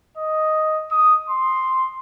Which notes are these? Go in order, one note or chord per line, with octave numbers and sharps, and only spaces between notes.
D#5
D#6
C6